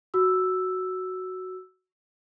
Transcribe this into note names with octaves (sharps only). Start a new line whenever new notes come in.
F#4 E6